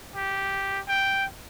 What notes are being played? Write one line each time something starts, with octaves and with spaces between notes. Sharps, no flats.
G4
G5